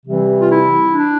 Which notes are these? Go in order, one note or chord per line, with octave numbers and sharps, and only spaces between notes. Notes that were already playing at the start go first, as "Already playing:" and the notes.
C3 E3 G3 C4
F4
E4
D4